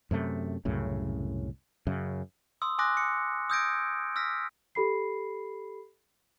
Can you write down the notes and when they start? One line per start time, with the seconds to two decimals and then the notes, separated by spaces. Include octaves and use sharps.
0.11 F#2 C3 A3
0.65 C2 F#2 A2 C#3
1.87 F#2 C#3
2.62 C6 D#6 E6
2.79 G#5 C6 D6 D#6 F#6 A#6
2.97 C#7
3.50 D#6 E6 G6 G#6 A#6 D7
4.16 E6 F6 A#6 B6
4.75 G4 A4 B5 C7